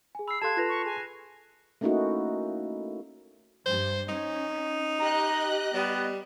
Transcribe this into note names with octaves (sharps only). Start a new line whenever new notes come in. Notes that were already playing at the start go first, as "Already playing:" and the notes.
G#4 G#5
B5 E6 C7
G4 A4 F5 A5 C6 F#6 G#6 E7
F4 A4 B4 F#6 A#6 F7
C#6
G#4 G#5
A3 A#3 C#4 D#4 E4 F#4
G2 C5
C#4 D#4
G4 D#5 A#5 F#6
G3 B3